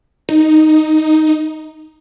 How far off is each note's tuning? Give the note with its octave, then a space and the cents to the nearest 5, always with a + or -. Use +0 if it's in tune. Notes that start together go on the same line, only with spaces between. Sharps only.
D#4 +0